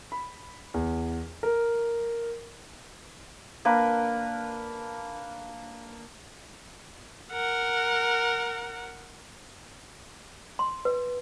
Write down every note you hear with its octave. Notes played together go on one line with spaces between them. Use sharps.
B5
E2
A#4
A#3 D4 A#4 B4
A#4 F#5
C6
B4